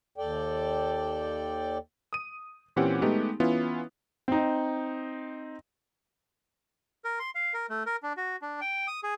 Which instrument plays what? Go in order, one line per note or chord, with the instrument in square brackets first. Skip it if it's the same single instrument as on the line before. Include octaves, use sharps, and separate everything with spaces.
[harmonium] D#2 A4 D5 G5
[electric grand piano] D#6 D#7
A#2 E3 C4 C#4 G4 F#5
G#3 A3 B3 D#4 G4
E3 B3 C#4 E4 F4
[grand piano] C4 D#4
[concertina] A#4
C6
F5
A#4
A3
A#4
D4
F#4
D4
G5
D#6
G#4